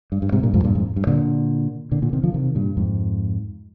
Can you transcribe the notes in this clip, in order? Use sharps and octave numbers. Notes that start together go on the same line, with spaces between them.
G2
G2
G#2 C3
G2 A#2
F2 G#2
G2 A#2
F2 G#2
G2
A#2 D3
A#2 D3
A#2 D3
C3 D#3
D3 F3
C3 D#3
G2 A#2
F2 G#2